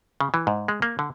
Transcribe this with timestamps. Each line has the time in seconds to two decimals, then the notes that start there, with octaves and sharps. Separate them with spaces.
0.21 C#3
0.34 E3
0.47 G#2
0.68 G#3
0.82 A#3
0.99 D3